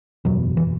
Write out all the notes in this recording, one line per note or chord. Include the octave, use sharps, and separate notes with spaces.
F#1 E2 B2 F#3
E3